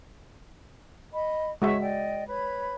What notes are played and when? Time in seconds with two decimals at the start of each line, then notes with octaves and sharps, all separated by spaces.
1.12 D#5 B5
1.62 G#3 F#4 C#5 E5 C#6
1.80 D5 D#5 G5
2.27 B4 C#5 B5